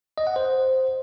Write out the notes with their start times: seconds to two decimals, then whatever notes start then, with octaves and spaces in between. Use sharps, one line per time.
0.18 D#5
0.27 F#5
0.36 C5